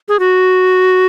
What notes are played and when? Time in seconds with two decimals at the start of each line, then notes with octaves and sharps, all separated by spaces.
0.09 G#4
0.19 F#4